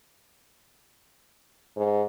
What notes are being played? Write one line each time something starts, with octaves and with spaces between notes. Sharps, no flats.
G#2